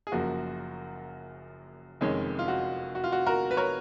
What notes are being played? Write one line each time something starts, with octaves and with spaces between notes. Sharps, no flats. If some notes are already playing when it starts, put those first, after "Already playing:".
G#4
F#1 F#2 F3 A#3 F#4
F1 F2 D#3 G#3 C#4
F4
F#4
F#4
F4
F#4
F#4 A#4
B4
A#4 C#5